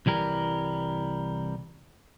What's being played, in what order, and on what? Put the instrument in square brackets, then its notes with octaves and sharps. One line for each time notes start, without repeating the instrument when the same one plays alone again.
[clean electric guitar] C2 E3 G3 A#4